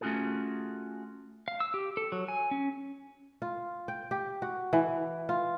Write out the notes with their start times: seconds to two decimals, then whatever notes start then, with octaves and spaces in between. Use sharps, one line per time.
0.01 A3 C#4 F4 F#4 G#4 A4
1.48 F5
1.60 E6
1.74 G4
1.97 A4
2.12 F#3
2.28 G#5
2.51 C#4
3.42 F4
3.88 G5
4.11 G4
4.42 F#4
4.73 E3
5.29 F4